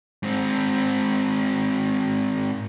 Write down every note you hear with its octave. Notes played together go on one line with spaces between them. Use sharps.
G#2 C4